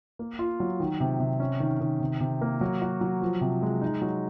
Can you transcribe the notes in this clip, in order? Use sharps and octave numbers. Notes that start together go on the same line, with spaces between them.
A#3
F4
F#3
D#3
C3
C3
C#4
D#3
D#3
C3
C3
A#3
F#3
F#4
F#3
F3
C3
G#3
D#4
F#3